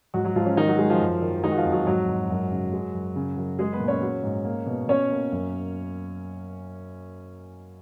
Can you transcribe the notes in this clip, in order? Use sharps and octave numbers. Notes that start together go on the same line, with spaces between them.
G#2 F#3 F#4
F#3 F#4
G#2 F3 F4
C#4
D#3 D#4
F#3 F#4
F#3 G#3 G#4
F3 F4
F#2
D#3
D#3 G#3 D#4
F#4
F3 F4
F2
F#3 F#4
G#2 F#3 F#4
G#2
F#2
C#3
G#3
F#2
C#3
F#2
G#3 G#4
B3 B4
A#2
C#4 C#5
F#3
G#2
A#3
B2
B2 C#4 C#5
A#3
F#2